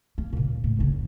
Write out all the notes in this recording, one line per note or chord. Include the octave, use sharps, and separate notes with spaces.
A#3
A#2 C#3
A2
F#1 C#3